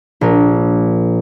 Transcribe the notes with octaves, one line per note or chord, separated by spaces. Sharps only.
A#1 A#4